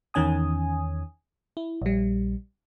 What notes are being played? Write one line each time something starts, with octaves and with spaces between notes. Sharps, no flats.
E2 D#3 C#4 G#5 D#6
E4
A#1 G3